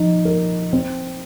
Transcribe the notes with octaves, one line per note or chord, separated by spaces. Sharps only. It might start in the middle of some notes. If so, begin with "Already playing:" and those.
Already playing: F3 D#4
A#4
C4